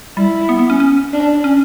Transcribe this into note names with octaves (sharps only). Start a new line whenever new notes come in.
G3 E4
B3
B3
C#4
C#4
D4
C#4